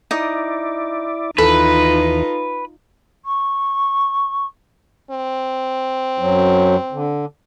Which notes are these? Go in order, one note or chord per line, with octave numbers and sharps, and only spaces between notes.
D#4 E4 D5 D#6
D#2 E3 D#4 F4 A4 B4
C#6
C4
F#2 F#3
D3